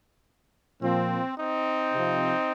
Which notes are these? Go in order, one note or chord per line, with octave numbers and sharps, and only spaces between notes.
A#2 F3 C4
C4 D#4
C3 F3